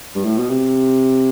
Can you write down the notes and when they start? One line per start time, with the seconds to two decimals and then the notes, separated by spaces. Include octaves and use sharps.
0.15 G2
0.24 A2
0.38 B2
0.50 C3